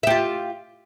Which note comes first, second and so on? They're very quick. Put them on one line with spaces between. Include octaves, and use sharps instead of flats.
E5 G4 F4